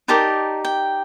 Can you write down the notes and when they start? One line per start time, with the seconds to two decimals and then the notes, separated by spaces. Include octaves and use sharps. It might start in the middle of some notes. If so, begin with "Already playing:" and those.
0.08 D#4 G4 A#4 D5 A5
0.65 G5